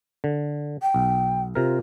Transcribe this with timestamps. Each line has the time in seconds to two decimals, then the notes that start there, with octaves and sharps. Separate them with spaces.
0.24 D3
0.82 G5
0.94 B1
1.55 C3 F4 A#4